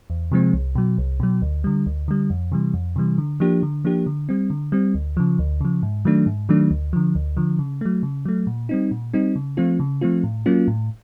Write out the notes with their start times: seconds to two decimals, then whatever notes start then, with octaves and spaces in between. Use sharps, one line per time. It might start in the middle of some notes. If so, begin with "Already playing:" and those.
0.10 E2
0.32 C3 F3 G#3 C4
0.53 C2
0.75 B2 F#3
0.98 C2
1.20 B2 F#3
1.42 D2
1.64 D3 G3
1.86 D2
2.08 D3 G3
2.30 F2
2.52 C3 E3 G3
2.74 F2
2.96 C3 E3 G3
3.18 D3
3.40 F3 A#3 D4 G4
3.63 D3
3.85 F3 A#3 D4 G4
4.06 D3
4.29 G3 C4
4.50 D3
4.72 G3 C4
4.95 D2
5.17 C#3 F3
5.39 D2
5.61 C#3 F3
5.83 G#2
6.05 D#3 F#3 A3 D4
6.26 G#2
6.49 D#3 F#3 A3 D4
6.71 D2
6.93 D3 F3
7.15 D2
7.37 D3 F3
7.59 C#3
7.81 F#3 A3
8.03 C#3
8.25 F#3 A3
8.47 A#2
8.69 G3 C4 D#4
8.91 A#2
9.14 G3 C4 D#4
9.36 C#3
9.57 F3 A3 C4 F4
9.80 C#3
10.01 F3 A3 C4 F4
10.24 A2
10.46 F#3 A#3 C#4 F4
10.68 A2